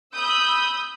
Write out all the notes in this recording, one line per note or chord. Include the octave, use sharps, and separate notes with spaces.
B5 D#6 E6 G6